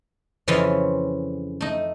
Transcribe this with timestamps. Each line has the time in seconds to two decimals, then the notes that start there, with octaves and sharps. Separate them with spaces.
0.48 F2 C#3 E3 C4 C#4 F4
1.61 A3 D#4